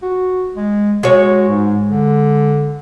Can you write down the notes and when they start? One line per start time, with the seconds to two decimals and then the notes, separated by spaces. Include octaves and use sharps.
0.02 F#4
0.56 G#3
1.03 G#3 F#4 C#5
1.48 G#2
1.88 D3